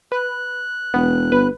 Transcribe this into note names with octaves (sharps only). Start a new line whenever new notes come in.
B4 F#6
E1 B3
G1 B4